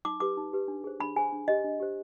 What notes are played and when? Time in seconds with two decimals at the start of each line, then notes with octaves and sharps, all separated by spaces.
0.05 D#4 D6
0.20 G4 B4 D6
0.37 D#4
0.53 G4 B4
0.68 D4
0.84 G#4 C5
1.00 D4 B5
1.16 G#4 C5 G#5
1.32 D4
1.48 G4 C5 D#5
1.64 D4
1.80 G4 C5